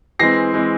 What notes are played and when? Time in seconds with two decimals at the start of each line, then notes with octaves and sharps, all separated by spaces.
0.19 E3 G#3 C4 A#6 C7
0.53 E3 G#3 C4